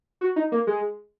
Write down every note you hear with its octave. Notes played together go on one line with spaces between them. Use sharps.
F#4
D#4
A#3
G#3